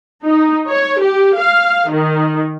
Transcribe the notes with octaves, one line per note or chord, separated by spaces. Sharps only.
D#4
C#5
G4
F5
D#3